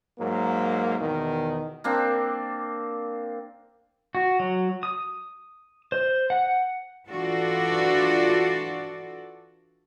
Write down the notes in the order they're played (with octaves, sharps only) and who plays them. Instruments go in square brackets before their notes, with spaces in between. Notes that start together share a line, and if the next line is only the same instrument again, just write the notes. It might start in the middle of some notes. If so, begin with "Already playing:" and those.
[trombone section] G#2 F#3 A#3
E2 B2 D#3
[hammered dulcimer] A#3 C4 D4
[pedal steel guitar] F#4
F#3
D#6
C5
F#5
[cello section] E3 D4 F4 F#4 A4 D5